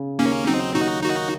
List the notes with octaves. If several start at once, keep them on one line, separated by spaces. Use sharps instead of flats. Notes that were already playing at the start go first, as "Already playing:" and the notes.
Already playing: C#3
D#2 A#3 C#4
F#3 C4 D#4
D#2 D#4 F#4
D#3 D#4 F#4